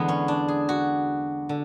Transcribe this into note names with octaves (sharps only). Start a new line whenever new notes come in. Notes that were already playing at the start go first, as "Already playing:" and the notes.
Already playing: E2 D3 G#3 B3
C#4
D4
G#4
F#4
D3